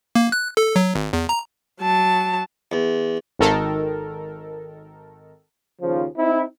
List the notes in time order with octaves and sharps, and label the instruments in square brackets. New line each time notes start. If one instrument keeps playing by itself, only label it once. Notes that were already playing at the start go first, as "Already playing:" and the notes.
[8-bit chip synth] A#3
F#6
A4
F#3
G#1
E2
A#5
[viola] F#3 A5
[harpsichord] E2
[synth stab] G#1 D#3 A4 A#4
[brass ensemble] D#2 C#3 F3
C4 D#4 E4